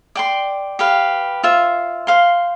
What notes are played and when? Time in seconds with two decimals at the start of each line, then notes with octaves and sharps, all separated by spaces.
0.15 D5 G5 C6
0.79 G4 B4 F5
1.43 F4 C5 E5
2.07 C5 F5 C6